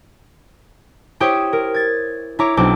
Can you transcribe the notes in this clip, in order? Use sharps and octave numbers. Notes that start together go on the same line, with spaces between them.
E4 G4 C5 C#5 G5 D#6
A#4
G#6 A6
E4 C#5 A#5 D6
B1 C4 D4 C5 D6